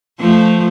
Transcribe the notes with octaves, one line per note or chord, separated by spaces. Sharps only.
F3 A3